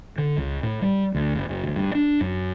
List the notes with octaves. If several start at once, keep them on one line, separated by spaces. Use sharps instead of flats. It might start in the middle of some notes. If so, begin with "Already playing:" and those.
D3
C#2
A2
G3
D2
F#1
F#1
D2
G2
D4
F#2